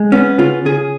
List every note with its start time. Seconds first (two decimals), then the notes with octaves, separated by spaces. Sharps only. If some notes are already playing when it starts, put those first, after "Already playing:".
Already playing: G#3
0.12 B3 C#4
0.38 C#3 F4
0.65 C#3 G#4